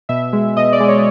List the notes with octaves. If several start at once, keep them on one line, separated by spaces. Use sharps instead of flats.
B2 E5
G#3
B2 D#5
D5
G#3
C#5